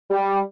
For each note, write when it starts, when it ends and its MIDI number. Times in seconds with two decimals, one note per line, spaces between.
0.11 0.39 55